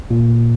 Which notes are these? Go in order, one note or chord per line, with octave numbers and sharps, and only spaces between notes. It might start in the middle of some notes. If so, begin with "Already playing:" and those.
A#2